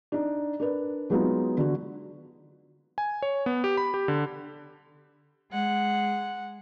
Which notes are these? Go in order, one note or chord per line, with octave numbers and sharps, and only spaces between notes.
D4 D#4
D4 A#4 B4 D5
F#3 G#3 B3 D#4 F4
D3 F#4
G#5
C#5
B3
G4
B5
G4
D3
G#3 F#5